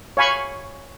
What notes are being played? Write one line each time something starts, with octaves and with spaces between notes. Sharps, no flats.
C#5 F5 G#5 B5 C#6